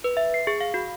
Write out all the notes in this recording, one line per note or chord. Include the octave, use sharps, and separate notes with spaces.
B4
E5
C7
G#4
F5
F#4